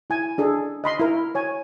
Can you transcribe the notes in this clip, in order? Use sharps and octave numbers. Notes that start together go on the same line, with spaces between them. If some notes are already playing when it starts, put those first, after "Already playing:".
E4 G#5
D4 G#4 A4
D#5 B5 C6
E4 A#4
C#5 G#5